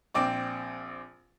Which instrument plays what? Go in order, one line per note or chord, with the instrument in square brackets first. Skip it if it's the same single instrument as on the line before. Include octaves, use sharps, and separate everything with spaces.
[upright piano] A#1 C4 D5 D6